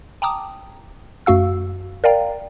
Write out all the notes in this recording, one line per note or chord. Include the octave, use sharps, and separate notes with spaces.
G5 A5 A#5 D6 D#6
F#2 A3 F#4 F5 E6
A#4 D5 F5 G5 A#5